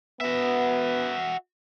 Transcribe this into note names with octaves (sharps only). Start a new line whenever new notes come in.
B3 F#4 E5